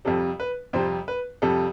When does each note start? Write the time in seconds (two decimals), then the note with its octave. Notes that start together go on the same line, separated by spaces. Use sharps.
0.05 F2 C3 G3 A4
0.40 B4
0.73 F2 C3 G3 C5
1.08 B4
1.42 F2 C3 G3 A4